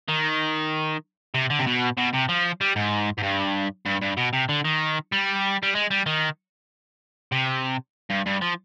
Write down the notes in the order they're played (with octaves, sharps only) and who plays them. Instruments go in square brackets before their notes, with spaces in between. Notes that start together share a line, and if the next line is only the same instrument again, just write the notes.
[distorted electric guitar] D#3
C3
D3
C3
B2
B2
C3
F3
G3
G#2
G#2
G2
G2
G2
B2
C3
D3
D#3
G3
G3
G#3
G3
D#3
C3
G2
G2
F3